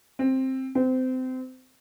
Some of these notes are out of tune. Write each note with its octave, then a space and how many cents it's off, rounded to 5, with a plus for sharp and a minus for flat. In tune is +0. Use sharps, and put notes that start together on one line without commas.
C4 +10
C4 -25